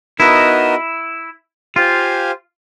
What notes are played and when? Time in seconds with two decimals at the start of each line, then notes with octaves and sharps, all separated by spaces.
0.20 B3 D#4 E4 F#4 A#4 D#5
1.76 F4 G4 C5 F5 G#5